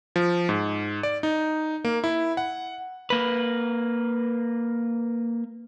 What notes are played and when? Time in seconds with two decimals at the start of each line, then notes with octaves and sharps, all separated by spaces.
0.16 F3
0.49 G#2
1.03 D5
1.23 D#4
1.85 A#3
2.04 E4
2.37 F#5
3.10 A#3 B4